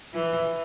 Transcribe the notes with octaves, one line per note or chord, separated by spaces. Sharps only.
E3